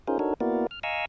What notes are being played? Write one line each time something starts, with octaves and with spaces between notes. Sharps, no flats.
C#4 D#4 F4 G#4 A#4 C5
D4 D#4 F#4 A4 A#4 C#5
A#3 B3 E4 F#4 A#4 D5
F6
D#5 F5 G#5 A#5 C#6 E6